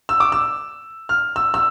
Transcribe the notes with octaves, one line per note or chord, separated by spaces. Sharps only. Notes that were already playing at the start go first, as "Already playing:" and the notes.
E6
D6
E6
F6
E6
E6